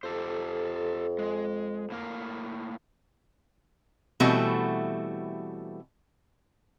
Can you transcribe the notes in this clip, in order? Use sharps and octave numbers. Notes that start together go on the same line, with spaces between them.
F2 G4 A4 C5
G#3
A2 A#3 A#4
B2 E3 G3 A3 C4 F#4